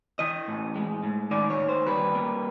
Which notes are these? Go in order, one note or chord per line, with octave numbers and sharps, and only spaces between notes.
E3 D#5
A2
G#3
A2
D#3 D5
C#5
D#2
C5
G3 B4
A#3